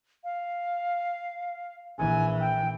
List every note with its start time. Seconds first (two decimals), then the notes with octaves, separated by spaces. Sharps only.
0.24 F5
1.98 A#1 E3 G#5
2.40 G5